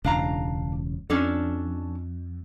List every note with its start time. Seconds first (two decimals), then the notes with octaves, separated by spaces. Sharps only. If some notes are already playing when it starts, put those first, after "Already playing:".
0.04 E1 C#2 D4 F5 A#5
1.10 F2 C#4 D4 A4